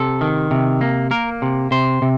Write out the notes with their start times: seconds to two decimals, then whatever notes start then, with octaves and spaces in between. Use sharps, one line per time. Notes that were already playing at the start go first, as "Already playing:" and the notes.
Already playing: C3 A4
0.21 D#3
0.51 C3
0.81 A#3
1.11 A#3 A#4
1.42 C3
1.71 C3 C5
2.02 C3